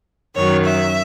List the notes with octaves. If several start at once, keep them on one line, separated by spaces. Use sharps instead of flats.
F#2 D#3 F#3 C#5
E5